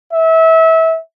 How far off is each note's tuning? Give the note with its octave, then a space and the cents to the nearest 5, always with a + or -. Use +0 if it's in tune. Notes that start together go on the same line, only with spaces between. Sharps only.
E5 -25